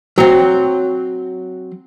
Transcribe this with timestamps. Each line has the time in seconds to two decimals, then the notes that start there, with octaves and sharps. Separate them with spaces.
0.18 F#3 C4